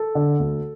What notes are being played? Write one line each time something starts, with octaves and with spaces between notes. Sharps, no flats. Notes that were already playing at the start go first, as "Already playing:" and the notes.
Already playing: A4
D3
D2